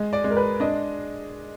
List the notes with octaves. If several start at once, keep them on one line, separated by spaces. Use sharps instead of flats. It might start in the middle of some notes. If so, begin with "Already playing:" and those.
Already playing: G#3 D#5
D5
G#3
A#4
B4
D4 D#5